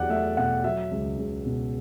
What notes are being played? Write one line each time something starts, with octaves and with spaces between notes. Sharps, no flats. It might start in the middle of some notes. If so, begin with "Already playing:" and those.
Already playing: E2 F#3 G4 D5 F#5
A3 E5
B2 F#5
F#3 E5
C#2
C#2
B2